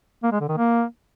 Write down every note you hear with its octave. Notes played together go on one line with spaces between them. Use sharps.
A#3
G#3
D3
D#3
A#3